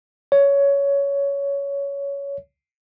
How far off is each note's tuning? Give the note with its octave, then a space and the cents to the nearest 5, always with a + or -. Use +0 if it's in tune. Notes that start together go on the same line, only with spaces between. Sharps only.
C#5 +15